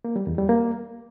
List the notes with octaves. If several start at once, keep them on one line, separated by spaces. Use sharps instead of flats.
A#3
G3
E2
G3
A#3